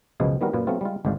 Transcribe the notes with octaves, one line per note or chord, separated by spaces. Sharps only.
C#2 F#2 B2 F3 G#3 G#4
D#3 E3 G3 B3 F#4 A#4
F#2 A#2 F4 B4
F#3 A3 B3 C4 F4
G3 G#3 F4
G#1 D2 G#2 D5 F5